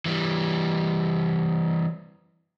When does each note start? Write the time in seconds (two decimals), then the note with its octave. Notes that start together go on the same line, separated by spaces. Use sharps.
0.06 E3 G3